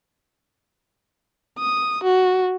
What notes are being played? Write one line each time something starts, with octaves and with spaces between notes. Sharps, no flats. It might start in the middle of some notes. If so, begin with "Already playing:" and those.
D#6
F#4